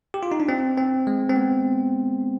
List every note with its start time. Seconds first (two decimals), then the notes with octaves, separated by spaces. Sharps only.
0.14 G4
0.23 F4
0.32 D#4
0.40 D4
0.49 C4
0.77 C4
1.07 G#3
1.29 C4
1.36 B3